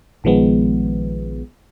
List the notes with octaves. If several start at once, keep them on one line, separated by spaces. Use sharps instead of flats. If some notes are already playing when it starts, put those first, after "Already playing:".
A#1 D#3 F3 G#3 B3